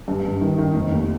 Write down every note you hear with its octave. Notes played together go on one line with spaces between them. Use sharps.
G2
G2
D#3
D#3
F1
D#2